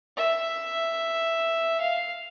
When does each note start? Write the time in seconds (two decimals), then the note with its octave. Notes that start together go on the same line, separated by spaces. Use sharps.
0.17 E5
1.81 F5